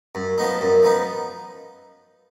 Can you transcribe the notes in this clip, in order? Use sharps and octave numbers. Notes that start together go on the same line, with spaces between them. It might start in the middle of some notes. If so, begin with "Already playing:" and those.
F#2
F3 B3 D#4
F#2
F3 B3 D#4